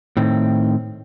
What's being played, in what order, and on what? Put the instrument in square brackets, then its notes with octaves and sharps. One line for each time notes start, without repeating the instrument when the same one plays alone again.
[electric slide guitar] A2 D#3 C4